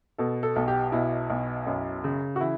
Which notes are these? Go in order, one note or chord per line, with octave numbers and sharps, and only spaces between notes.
B2 A4
A4
B1
G4
B2 E4
B1
F#2
C#3
F#4
E3 E4